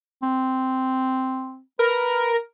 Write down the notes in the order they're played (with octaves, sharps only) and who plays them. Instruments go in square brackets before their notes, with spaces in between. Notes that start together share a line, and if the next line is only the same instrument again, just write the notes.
[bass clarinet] C4
[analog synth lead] A#4 [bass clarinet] B4